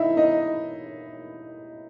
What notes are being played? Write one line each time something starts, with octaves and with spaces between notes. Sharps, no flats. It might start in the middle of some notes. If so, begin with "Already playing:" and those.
Already playing: D#4 E4 D#5 E5
D#4 D#5